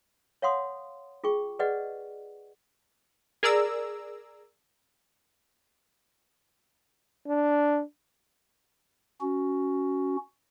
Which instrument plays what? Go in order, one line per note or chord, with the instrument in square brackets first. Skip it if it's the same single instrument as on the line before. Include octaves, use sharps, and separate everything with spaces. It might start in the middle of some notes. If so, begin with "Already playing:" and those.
[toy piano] C#5 F5 F#5 C6 D#6
F4 G#4 G5 C#6
G#4 B4 D5 D#5 F#5
[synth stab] G#4 A#4 D5 A#5 E6
[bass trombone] D4
[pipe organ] C#4 F#4